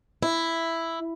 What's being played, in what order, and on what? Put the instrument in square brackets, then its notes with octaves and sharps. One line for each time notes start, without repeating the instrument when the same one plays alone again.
[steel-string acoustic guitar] E4